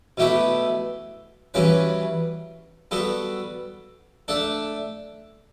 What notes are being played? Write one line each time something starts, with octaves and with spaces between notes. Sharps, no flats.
B2 A3 E4 G4 B4
E3 G3 C#4 F#4 B4
G3 B3 F#4 A4
A3 D4 A4